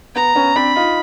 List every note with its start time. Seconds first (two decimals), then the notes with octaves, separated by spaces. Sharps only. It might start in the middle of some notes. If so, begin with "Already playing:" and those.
0.15 B3 A#5
0.35 B3 C#4
0.56 C4 D4 B5
0.76 D#4 F4